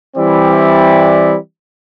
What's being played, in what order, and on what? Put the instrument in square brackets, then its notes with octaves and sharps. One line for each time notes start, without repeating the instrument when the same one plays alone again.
[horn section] E3 G3 C4 E4 D5